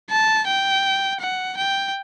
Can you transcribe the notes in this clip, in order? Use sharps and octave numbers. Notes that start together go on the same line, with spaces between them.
A5
G5
F#5
G5